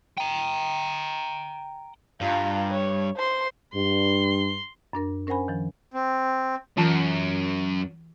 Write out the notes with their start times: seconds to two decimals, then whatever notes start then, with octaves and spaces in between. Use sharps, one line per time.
0.17 G5 A#5
2.21 G2 F4 A#5
2.71 C#5
3.16 C5 C6
3.75 G2 C6
4.93 F#2 D4 A#4
5.27 C#4 A#4 C5 F#5 G#5 B5
5.48 D#3 F3
5.94 C4
6.77 F#2 E3 F4 A5